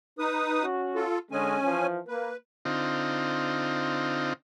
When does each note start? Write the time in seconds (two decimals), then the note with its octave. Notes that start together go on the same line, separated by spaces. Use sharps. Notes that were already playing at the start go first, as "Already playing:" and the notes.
0.19 D#4 B4 D#6
0.61 C#4 F#4
0.95 F4 A4
1.32 D3 G#3 C#4 G#5
1.64 E3 F3
2.08 A#3 B4
2.65 D3 C4 D#4 F4